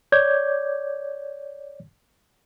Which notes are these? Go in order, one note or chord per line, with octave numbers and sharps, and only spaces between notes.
C#5 D5 D6 G6 G#6